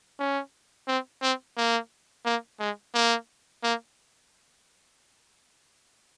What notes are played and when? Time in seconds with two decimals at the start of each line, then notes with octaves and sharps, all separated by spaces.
0.19 C#4
0.88 C4
1.22 C4
1.57 A#3
2.25 A#3
2.60 G#3
2.95 A#3
3.63 A#3